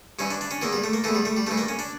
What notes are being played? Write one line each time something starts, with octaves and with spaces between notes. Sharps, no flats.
G2 E3 C#4
D4
D4
C#4
E2 E3 A#3
G3
A3
A#3
E2 E3 A3
G3
A3
G3
G2 E3 A3
A#3
C#4
D4